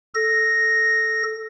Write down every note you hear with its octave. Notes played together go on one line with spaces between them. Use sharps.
A4 A#6